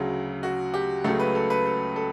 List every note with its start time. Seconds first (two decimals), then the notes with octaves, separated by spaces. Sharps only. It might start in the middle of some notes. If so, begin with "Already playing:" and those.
Already playing: D2 C#3 F#3
0.43 F#4
0.74 G4
1.04 C#2 C#3 F#3 A3 A4
1.20 B4
1.35 A4
1.50 B4
1.66 A4
1.96 A4